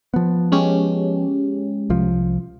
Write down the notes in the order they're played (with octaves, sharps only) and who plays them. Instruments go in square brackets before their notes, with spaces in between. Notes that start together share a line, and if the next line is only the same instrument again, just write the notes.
[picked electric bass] F3 B3
[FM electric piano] G#3 C#4 G4
[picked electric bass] C2 F3